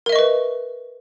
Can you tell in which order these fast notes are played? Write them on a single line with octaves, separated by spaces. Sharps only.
A#4 E5 D#5 C#6 B4